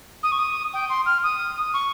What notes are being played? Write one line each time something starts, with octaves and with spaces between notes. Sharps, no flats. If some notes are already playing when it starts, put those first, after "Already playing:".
D#6
C#6
D#6
G5
C6
F6
D#6
C#6